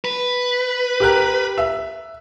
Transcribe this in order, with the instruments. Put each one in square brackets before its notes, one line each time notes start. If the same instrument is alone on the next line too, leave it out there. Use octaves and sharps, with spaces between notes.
[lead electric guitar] B4
[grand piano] G4 A#4 F#6
E5